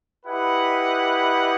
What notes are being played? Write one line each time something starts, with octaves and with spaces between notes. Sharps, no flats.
E4 G4 B4 D#5 F#5